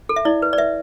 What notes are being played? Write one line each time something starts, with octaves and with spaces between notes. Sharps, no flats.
A4
E5
E4 D5
B4
D5
B4 E5